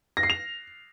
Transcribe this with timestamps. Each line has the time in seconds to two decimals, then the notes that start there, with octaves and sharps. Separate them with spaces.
0.17 A#6
0.23 C7
0.30 F7